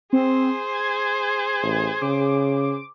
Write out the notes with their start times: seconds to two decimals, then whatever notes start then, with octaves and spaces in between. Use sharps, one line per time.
0.13 C4 G#4 C5
0.72 G#6
1.63 A1
2.02 C#3 D6